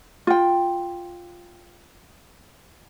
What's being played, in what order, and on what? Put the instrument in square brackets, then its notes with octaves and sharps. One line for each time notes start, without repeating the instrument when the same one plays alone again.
[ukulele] F4 G5